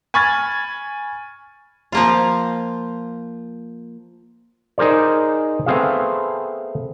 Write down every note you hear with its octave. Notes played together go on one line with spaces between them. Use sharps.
G#5 B5 C#6 F6 G#6 A6
F3 A#3 F4
D#4 G#4 A#4 C5 D5
A3 B3 C4 G#4 F5